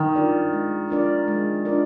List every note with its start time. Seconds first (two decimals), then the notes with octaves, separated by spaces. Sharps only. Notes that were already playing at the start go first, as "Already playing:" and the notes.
Already playing: D#3
0.16 D4 F4 A#4 D5
0.53 G#3
0.90 D4 F4 A#4 D5
1.28 G#3
1.65 D4 F4 A#4 D5